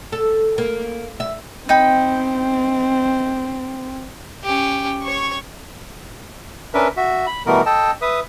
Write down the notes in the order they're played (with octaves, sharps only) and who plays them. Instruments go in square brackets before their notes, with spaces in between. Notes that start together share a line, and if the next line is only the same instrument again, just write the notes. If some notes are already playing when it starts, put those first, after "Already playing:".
[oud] A4
A#3
E5
[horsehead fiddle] C4 [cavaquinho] D#4 G5 B5
[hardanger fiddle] C#4 G4
C#5 C#6
[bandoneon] C#4 D4 A#4 B4 E5
F#4 E5
B5
B2 E3 G3 A3 B3 A#4
A4 D#5 G5 A5
B4 E5 D#6